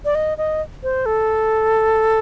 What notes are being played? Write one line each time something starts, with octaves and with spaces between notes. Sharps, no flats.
D5
D#5
D#5
C5
A4